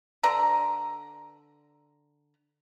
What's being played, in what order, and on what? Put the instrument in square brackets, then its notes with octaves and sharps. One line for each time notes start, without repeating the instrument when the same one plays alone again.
[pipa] D3 B4 D5 A#5